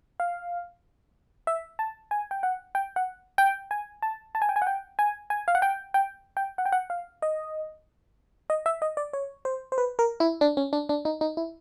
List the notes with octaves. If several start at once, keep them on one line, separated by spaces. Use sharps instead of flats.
F5
E5
A5
G#5
G5
F#5
G5
F#5
G5
G#5
A5
A5
G#5
G5
G#5
F#5
G5
G#5
G#5
F5
F#5
G5
G5
G5
F#5
G5
F#5
F5
D#5
D#5
E5
D#5
D5
C#5
C5
C5
B4
A#4
E4
D4
C#4
D4
D4
D#4
D#4
E4